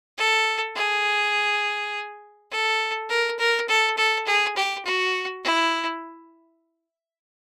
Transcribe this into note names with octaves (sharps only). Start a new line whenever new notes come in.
A4
G#4
A4
A#4
A#4
A4
A4
G#4
G4
F#4
E4